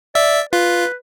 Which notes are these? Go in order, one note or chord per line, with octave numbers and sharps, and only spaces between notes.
D5 E5
F4 B4